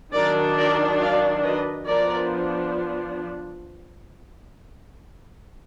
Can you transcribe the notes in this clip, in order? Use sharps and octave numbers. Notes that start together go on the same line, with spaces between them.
D#3 F#3 D4 A#4 D5
A#4 D5
D5 F5
B4 D#5
F3 B3 D4 A#4 D5